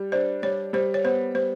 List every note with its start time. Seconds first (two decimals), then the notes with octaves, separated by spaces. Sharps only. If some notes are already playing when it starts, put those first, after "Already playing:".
Already playing: G3
0.12 D4 C5
0.43 G3 C#5
0.73 G3 C5
0.94 C#5
1.04 B3 C5
1.35 G3 C5